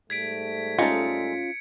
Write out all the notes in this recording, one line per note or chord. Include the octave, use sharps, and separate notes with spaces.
G#2 G3 A3 G#6 B6 D7
G#3 C#4 D#4 F4 A4 C#7